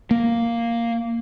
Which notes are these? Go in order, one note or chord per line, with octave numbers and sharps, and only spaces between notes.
A#3